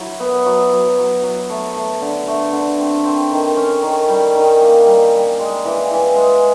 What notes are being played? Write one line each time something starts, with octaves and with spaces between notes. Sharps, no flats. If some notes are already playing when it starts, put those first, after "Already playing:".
Already playing: F#3 E4
B3
F#3
F#3
F#3
F#3
A3
A3
D3
A3
D3
C4
C4
D#3
C#4
D#3
G3
D#3
A#3
G3
G3
G#3
E3
E3
G#3